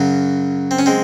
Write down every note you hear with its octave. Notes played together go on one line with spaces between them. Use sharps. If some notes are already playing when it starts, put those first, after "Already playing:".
Already playing: F#2 C#3 F#3
C4
C#4
G#3 C4